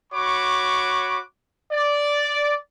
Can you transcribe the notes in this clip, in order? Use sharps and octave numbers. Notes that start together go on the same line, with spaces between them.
F#4 C#5 B5 C#6 D6
D5